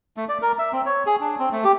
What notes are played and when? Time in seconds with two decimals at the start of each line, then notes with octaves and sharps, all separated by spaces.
0.17 A3
0.29 D5
0.42 A#4
0.59 E5
0.73 C4
0.86 C#5
1.06 G#4
1.21 D4
1.39 C4
1.52 A3
1.64 G4